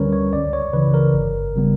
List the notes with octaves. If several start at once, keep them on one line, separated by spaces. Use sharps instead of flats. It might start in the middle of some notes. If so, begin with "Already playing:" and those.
Already playing: D2 D3 G3 C#4 A#4 B4 C#5
C#5
C#2 D5
C#5
C#3 E3 B4
A#4
G1
C#3 G3 B3